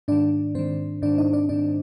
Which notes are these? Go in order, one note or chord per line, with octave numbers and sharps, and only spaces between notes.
G#2 D#3 D4 D5
G#2 D#3 C4 C5
G#2 D#3 D4 D5
D#4 D#5
D4 D5
G#2 D#3 D4 D5